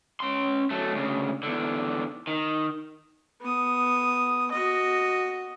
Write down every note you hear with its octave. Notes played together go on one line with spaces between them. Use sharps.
C#4 C6
F#3 A3
D2 C#3
E2 D3
D#3
B3 D#6
F#4 D#5